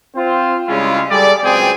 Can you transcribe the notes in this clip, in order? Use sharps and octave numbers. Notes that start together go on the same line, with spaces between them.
C4 F4 C5
C#3 G3 G#3 C#4 E4 F4
G3 G#4 A4 D5
C#2 F#3 C4 G#4 G5